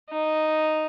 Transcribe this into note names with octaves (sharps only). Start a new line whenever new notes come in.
D#4